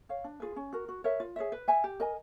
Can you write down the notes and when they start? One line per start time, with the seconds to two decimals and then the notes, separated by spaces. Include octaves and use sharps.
0.09 C#5 F5
0.24 D4
0.40 F4 G#4 B4
0.56 C#4
0.73 F#4 A#4
0.88 F#4
1.04 A#4 C#5 E5
1.20 F4
1.36 G#4 C#5 E5
1.52 B4
1.68 E5 G#5
1.84 G4
2.00 A#4 D#5 G#5